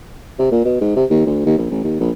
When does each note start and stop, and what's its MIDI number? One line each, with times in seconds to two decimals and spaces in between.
0.39 0.47 48
0.52 0.61 46
0.65 0.79 47
0.81 0.95 44
0.96 1.05 48
1.10 1.24 39
1.27 1.43 38
1.46 1.55 39
1.58 1.68 34
1.71 1.83 33
1.84 1.97 39
2.00 2.11 34